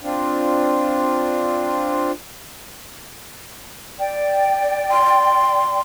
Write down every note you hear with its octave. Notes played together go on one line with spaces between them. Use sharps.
C4 D4 F4
D5 G5
C6